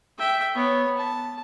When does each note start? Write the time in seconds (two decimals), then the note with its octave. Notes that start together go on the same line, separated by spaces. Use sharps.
0.19 E5 G5
0.55 B3 C#5
0.98 A5